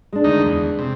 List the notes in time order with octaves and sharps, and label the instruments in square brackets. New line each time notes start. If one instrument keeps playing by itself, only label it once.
[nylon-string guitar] G#3 D4
[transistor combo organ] D2 D#3 D#4
E2
C3